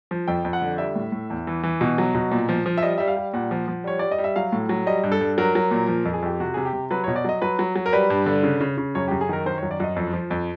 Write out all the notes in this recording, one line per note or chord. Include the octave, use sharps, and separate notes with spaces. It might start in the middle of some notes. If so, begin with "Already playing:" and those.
F3
F2 G5
F2
F#5
D3
G3 E5
A2
A2
E2
E3
E3
B2
F#3
B2
A#2
F3
F3
E5
G3 D#5
G3 E5
F5
G3
A#2 F#5
F3
F3
G3 C#5
G3 D5
D#5
G3
E5
F#3 F5
A2
F#3
G3 D#5
G2
A4
G2
F#3 A#4
F#3
A#2
F3
F2
G#4
F2 G4
C3 F#4
C3 G#4
G4
C3
F#3 B4
C#5
B2
D5
F#3 D#5
F#3 B4
F#3
F#3
A#4
G3 B4
G2
D3
C#3
C#3
C#3
F#2 C#5
F#2 G4
G#4
D#3 A#4
D#3 C5
C#5
F#2
D5
F#2 D#5
F2
F3
F2